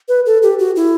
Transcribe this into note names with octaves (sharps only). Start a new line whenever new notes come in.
B4
A4
G4
F#4
E4